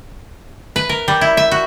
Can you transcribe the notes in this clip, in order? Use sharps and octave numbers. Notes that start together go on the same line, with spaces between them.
B4
A#4
G3
E4
E5
F#4